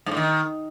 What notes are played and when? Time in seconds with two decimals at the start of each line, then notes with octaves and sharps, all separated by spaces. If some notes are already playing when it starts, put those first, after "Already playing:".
0.06 G#2
0.11 A2
0.17 D#3